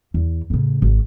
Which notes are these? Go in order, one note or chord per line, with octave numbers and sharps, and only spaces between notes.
E2
A2 C#3
G#1